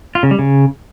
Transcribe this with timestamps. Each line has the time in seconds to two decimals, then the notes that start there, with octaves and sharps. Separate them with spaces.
0.15 F4
0.23 C#3
0.31 G3
0.39 C#3